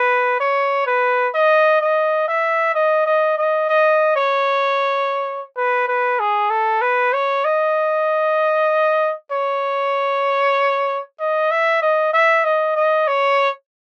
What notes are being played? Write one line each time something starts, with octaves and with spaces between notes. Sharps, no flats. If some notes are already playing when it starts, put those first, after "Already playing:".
Already playing: B4
C#5
B4
D#5
D#5
E5
D#5
D#5
D#5
D#5
C#5
B4
B4
G#4
A4
B4
C#5
D#5
C#5
D#5
E5
D#5
E5
D#5
D#5
C#5